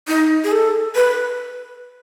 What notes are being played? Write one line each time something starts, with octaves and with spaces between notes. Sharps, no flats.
D#4
G#4
A4
B4